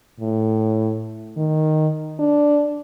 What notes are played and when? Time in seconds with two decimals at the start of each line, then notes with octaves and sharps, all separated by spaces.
0.20 A2
1.37 D#3
2.20 D4